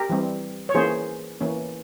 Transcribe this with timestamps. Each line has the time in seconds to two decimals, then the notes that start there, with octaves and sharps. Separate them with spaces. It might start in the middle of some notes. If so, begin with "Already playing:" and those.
Already playing: G4 A#4
0.10 E3 G3 C4
0.69 C#5
0.74 E3 A#3 C#4 G#4 C5
1.41 E3 A#3 C#4